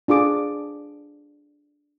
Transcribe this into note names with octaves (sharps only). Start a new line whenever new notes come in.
D4 F4 G#4 D6